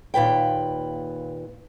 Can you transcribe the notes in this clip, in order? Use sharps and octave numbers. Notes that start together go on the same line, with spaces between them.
D#2 A#2 B4 G5